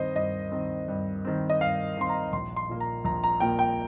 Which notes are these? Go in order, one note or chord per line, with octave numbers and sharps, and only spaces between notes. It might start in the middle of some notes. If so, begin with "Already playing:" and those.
Already playing: G2 D#3 C4 C5 D#5
G2 D#5
D#3 C4
G2
D#3 C4
D#5
G2 F5
D#3 C4 C6
A#5
A#1 C6
C6
A#2 A#3
A#5
A#1 A#5
A#5
A#2 A#3 G5
G5